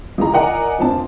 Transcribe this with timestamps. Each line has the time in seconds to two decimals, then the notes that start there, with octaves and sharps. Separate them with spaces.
0.18 C#2 E3 G#3 A#5
0.33 A#4 D5 D#5 F#5 G#5 A#5
0.79 F1 F3 C4 D4 A5